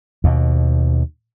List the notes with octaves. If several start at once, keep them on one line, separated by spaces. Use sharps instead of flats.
D#2 B2